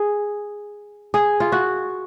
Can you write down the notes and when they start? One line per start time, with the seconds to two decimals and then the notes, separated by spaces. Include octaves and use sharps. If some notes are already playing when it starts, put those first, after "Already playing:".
Already playing: G#4
1.14 G#4
1.40 F4
1.52 F#4